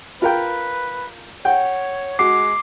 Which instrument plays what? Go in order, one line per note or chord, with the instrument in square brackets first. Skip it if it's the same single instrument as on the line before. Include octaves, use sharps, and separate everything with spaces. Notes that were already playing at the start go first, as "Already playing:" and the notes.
[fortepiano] F4 A#4 G5 [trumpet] B4
[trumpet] C#5 [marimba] F#5 [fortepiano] G5
[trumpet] G#3 [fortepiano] F#4 [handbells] D6 C7